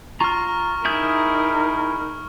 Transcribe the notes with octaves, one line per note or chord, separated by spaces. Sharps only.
F4 A#5 C#6 F6
D#4 E4 G#4 A#4 G6